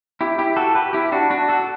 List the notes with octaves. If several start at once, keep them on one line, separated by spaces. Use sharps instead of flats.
E4 G4
E4 G4
F#4 A4
G4 B4
E4 G4
D4 F#4
D4 F#4
F#4 A4